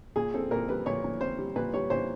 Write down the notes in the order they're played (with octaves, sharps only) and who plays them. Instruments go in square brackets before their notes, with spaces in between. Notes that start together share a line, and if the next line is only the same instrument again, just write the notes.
[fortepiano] A#2 G#4
C4 A4
A#2 A#4
G3 B4
A#2 C#5
A#2
C4 C5
G3
A#2 B4
G3 C#5
A#2 C5